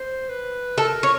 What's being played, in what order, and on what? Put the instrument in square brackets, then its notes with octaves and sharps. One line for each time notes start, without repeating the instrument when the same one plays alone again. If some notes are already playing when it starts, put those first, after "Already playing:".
Already playing: [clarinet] C5
B4
[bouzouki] A4 [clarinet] A#4
[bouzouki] C#5